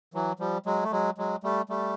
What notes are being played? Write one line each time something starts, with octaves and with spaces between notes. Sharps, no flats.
E3 F#3
F3 G3
F#3 G#3
A3
F#3 G#3
F#3 G#3
G3 A3
G3 A3